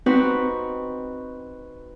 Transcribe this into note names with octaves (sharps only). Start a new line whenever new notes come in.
C4 D#4 F#4 B4